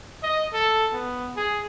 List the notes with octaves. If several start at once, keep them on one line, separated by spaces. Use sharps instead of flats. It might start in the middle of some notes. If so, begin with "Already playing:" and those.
D#5
A4
B3
G#4